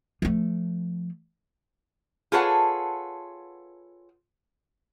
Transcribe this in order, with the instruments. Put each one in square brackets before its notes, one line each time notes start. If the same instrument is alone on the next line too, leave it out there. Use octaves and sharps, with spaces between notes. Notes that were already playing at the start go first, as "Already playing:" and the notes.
[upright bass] F3 A3
[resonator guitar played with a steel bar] F4 G#4 A4 B4 C#5 F#5